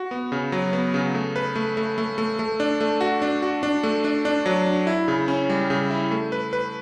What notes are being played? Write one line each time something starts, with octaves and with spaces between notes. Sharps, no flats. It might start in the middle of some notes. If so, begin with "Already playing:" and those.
Already playing: F#4
B3
C#3
F#3
B3
C#3
A3
B4
A3
A3
A3
A3
A3
D4
A3
F#4
D4
F#4
D4
A3
D4
D4
F#3
D4
E4
C#3
C#4
G3
C#3
E4
A3
B4
B4